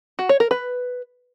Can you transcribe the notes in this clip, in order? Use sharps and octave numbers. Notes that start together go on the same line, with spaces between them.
F#4
C#5
A#4
B4